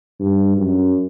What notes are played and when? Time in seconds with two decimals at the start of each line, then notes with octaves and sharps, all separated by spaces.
0.20 G2
0.58 F#2